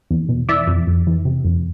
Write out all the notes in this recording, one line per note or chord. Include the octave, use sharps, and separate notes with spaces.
E2
B2
E3 D5 E5
F2
F2
E3
C3
F2